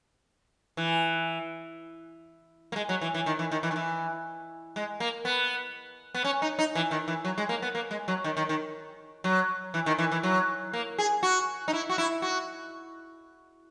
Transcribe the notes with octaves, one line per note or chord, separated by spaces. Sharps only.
E3
A#3
G#3
F#3
E3
E3
D#3
E3
D#3
E3
D#3
E3
G#3
A#3
B3
B3
C#4
D#4
D#4
E3
D#3
E3
F#3
G#3
A#3
B3
A#3
G#3
F#3
D#3
D#3
D#3
F#3
E3
D#3
E3
E3
F#3
A#3
G#4
F#4
D#4
E4
F#4
E4
F#4